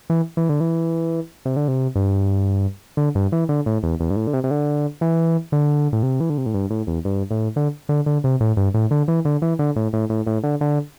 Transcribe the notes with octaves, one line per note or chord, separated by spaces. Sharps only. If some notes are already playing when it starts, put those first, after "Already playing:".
E3
E3
D3
E3
C3
D3
C3
G2
D3
G2
E3
D3
A2
E2
E2
G2
A2
D3
C3
C3
D3
E3
D3
A2
C3
E3
D3
C3
A2
G2
A2
E2
G2
A2
D3
D3
D3
C3
A2
G2
A2
D3
E3
D3
E3
D3
A2
A2
A2
A2
D3
D3